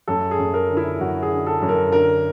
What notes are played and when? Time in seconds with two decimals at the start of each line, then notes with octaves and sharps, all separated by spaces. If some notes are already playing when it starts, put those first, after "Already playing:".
0.08 F#2 A4
0.31 G#4
0.39 F#2
0.54 A#4
0.70 D3
0.77 E4
1.00 F#2 F#4
1.22 G#4
1.31 D3
1.46 A4
1.62 F#2
1.69 A#4
1.92 D3 A#4